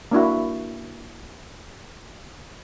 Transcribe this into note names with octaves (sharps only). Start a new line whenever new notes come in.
A#3 D4 E4 F#4